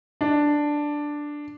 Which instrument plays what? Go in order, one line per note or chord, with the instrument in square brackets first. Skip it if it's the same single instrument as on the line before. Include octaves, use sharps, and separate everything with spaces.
[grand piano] D4